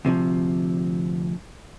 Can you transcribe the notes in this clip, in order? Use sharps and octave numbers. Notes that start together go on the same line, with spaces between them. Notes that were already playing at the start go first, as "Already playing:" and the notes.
D2 C3 E3 F3